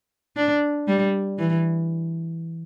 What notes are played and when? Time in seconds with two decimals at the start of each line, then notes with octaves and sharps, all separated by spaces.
0.36 D4
0.88 G3
1.39 E3